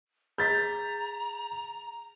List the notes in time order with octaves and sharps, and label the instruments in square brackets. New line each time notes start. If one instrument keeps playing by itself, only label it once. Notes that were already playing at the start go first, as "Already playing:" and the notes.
[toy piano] G#4 B5 [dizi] A#5 [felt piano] G6 A6 B6